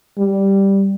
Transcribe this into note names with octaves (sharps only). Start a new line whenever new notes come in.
G3